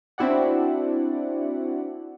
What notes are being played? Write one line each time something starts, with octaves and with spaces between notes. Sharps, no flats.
C4 D4 E4 F#4 D5 F#5